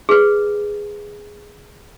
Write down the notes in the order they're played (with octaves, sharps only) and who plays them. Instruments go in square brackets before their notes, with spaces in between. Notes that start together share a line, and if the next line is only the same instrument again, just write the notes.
[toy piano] G#4 B4